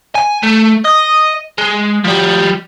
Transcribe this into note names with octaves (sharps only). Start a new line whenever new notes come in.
G#5
A3
D#5
G#3
F3 G3